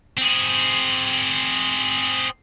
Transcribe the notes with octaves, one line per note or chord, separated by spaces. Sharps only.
C4 G#4